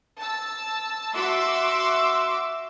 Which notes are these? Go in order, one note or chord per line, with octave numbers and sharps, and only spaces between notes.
A5 E6
F#4 E5 C6 D6 E6